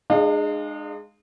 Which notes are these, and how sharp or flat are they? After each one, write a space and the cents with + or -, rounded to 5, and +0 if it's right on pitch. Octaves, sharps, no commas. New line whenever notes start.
G#3 +0 D4 +45 F5 +0